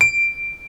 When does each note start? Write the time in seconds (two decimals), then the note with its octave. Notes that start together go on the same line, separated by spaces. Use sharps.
0.01 D7